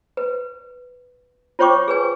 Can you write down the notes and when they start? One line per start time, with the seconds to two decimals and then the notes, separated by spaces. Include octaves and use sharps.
0.17 B4
1.59 F4 C5 C#5 G5 C#6 D6
1.88 G#4 B4 G#5